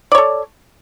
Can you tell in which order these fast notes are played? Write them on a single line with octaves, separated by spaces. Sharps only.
D5 C#5 A4